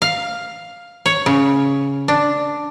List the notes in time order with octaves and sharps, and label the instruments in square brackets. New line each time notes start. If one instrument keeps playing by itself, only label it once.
[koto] F5
C#5
C#3
D4